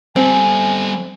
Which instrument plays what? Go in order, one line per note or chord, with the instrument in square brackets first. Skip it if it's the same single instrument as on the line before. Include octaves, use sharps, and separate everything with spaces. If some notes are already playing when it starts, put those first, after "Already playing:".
[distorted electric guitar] G3 A4 [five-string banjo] C4 [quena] G#5